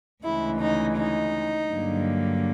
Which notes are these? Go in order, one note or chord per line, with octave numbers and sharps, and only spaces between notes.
D2 C#3 E3 G#3 E4
D#4
D#4
G2 D3 F#3 A#3